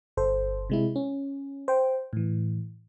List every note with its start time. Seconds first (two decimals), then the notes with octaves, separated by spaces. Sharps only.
0.17 G1 A4 C5
0.70 C3 G#3 E4
0.96 C#4
1.68 C5 G5
2.13 A2 E3